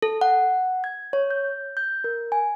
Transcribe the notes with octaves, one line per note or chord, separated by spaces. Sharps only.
A4
F#5
G#6
C#5
G6
G6
A#4
G#5